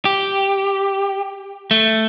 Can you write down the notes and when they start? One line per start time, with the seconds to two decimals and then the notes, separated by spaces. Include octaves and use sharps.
0.05 G4
1.71 A3